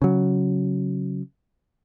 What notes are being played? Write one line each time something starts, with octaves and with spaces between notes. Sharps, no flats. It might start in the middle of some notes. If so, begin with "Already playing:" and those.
C#3 F#3